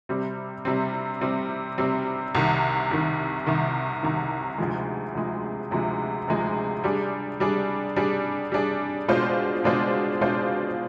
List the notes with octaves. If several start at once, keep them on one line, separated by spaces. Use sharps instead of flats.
C3 G3 C4
C3 G3 C4
C3 G3 C4
C3 G3 C4
C2 C3 D#3
C2 C3 D#3
C2 C3 D#3
C2 C3 D#3
D2 C3 F3 G#3
D2 C3 F3 G#3
D2 C3 F3 G#3
D2 C3 F3 G#3
G3 D4 G#4
G3 D4 G#4
G3 D4 G#4
G3 D4 G#4
B2 G#3 D4 F4 C5
B2 G#3 D4 F4 C5
B2 G#3 D4 F4 C5